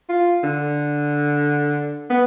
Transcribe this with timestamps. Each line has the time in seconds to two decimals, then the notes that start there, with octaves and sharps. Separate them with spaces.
0.09 F4
0.44 D3
2.10 B3